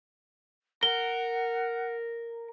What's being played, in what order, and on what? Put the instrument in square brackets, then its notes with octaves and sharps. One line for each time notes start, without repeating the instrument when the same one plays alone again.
[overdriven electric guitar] A#4 [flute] F#5 [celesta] G7